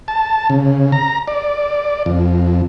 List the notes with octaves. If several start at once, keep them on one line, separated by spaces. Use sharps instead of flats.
A5
C#3
A#5
D5
F2